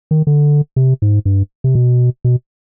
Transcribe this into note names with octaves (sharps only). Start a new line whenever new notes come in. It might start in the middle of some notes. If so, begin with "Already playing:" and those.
D#3
D3
C3
G#2
G2
C3
B2
B2